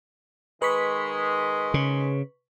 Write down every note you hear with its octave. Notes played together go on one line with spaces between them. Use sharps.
D#3 G#3 B4 C#6 B6
C#3